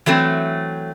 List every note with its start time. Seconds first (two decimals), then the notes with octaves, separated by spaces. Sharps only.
0.06 E3 F#3 A3 C4